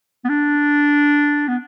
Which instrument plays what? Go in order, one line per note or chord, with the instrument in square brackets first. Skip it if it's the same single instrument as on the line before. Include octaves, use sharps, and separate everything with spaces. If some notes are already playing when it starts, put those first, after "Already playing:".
[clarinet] B3
D4
B3